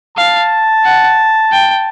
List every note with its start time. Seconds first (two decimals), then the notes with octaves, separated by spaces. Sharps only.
0.17 F5 A5
0.85 F#5
1.53 G5